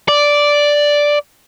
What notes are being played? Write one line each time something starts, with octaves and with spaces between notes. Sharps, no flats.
D5